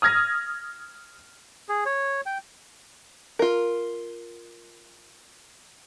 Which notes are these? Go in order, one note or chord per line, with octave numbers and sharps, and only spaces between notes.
D#6 F6 G#6 A#6
G#4
C#5
G5
F4 A#4